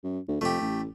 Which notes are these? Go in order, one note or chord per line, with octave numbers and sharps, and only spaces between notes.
F#2
D2
F2 A3 G4
A1